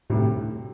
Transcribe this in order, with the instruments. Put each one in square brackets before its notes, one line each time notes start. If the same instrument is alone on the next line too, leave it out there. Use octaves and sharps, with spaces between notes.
[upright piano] D2 C3 G3 [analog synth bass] A2